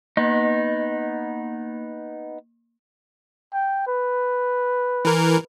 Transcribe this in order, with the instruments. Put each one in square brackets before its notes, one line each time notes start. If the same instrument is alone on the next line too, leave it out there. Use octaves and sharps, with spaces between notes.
[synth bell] A#3 [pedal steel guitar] B3 D#4
[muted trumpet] G5
B4
[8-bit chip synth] E3 A#4